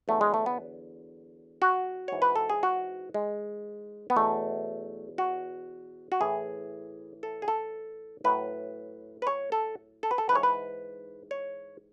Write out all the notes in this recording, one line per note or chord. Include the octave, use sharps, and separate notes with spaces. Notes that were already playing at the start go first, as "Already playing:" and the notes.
E2 D3 F#3 A3
G#3
A3
B3
F#4
G#2 E3 C#5
B4
A4
G#4
F#4
G#3
B3
E2 B2 F#3 A3
F#4
F#4
A2 E3 G#4
A4
G#4
A4
A2 F#3 B4
B4
C#5
A4
A4
B4
A4
G#2 E3 B4 C#5
B4
C#5